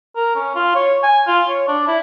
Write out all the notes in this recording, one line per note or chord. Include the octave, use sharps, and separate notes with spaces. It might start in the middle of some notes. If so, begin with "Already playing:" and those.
A#4
C#4
F4
C#5
G#5
F4
C#5
D4
E4